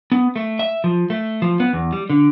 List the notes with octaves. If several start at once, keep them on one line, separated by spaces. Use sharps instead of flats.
B3
A3
E5
F3
A3
F3
B3
E2
G3
D3